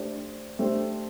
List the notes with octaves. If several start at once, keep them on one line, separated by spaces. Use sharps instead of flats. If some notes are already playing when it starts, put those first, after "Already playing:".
Already playing: A3 D4 G4 C5
A3 D4 G4 C5